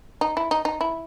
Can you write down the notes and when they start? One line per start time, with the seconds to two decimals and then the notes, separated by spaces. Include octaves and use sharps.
0.21 D#4
0.37 E4
0.51 D#4
0.65 D#4
0.81 E4